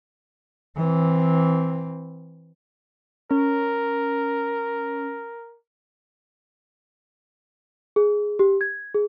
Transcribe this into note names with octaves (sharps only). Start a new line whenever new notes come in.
E3 C4
C#4 A#4
G#4
G4
G#6
G#4